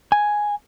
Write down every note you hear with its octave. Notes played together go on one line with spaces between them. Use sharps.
G#5